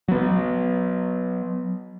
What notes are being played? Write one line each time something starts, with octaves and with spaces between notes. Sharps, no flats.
F#3 B3